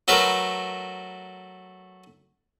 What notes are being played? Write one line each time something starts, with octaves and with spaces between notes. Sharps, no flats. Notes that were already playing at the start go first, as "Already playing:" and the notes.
F#3 A3 A#4 B4